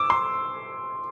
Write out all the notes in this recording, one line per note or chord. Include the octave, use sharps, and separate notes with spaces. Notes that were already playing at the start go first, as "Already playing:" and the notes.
Already playing: D6 E6
C6